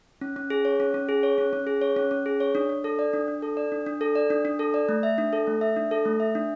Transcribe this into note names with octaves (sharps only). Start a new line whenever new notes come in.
C#4
C#4
G#4
C#5
C#4
C#4
G#4
C#5
C#4
C#4
G#4
C#5
C#4
C#4
G#4
C#5
D4
D4
A4
D5
D4
D4
A4
D5
D4
D4
A4
D5
D4
D4
A4
D5
A3
E5
D4
A4
A3
E5
D4
A4
A3
E5
D4